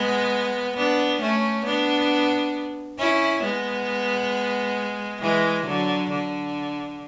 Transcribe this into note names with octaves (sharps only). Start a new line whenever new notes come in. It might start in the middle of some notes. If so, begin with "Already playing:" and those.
Already playing: G#3 B3
B3 D4
A3 C#4
B3 D4
C#4 E4
G#3 B3
E3 G#3
D3 F#3
D3